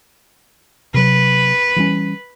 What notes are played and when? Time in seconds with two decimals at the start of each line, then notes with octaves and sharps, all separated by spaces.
0.94 C3 F#3 B4
1.76 E3 G3 C#4